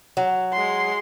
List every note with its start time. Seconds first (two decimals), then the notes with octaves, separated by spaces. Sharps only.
0.17 F#3
0.53 G#3 C6